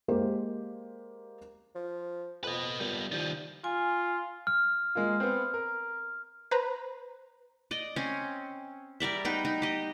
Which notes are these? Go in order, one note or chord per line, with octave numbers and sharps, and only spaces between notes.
G#3 A#3 G4 C5
F3
F2 B4 D#5
A#2 G3 B3
D#3 F3 G3
F4 G#5
F6
G#3 A#3 F4
B3 C4
A#4
B4 C5 A#5
D5 D#5
C4 C#4
G3 A#4 D5 E5
B3 D#4 G5
D#4
G4 D#5